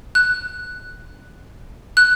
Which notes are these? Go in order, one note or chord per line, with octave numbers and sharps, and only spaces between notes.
F#6
F#6